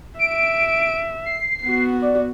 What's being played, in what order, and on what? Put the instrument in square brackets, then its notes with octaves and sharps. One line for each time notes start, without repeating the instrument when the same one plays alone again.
[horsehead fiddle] E5 [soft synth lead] D7
[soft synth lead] C7
[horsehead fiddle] B3 F#4
[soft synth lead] D5